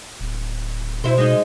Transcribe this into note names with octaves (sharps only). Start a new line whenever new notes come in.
D1
B2 E4 C5
G#3 D#4